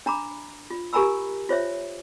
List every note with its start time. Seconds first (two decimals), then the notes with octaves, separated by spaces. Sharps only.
0.06 D4 A#5 B5 D6
0.70 F4
0.93 G4 A#4 G#5 A#5 B5 E6
1.49 F4 C5 C#5 E5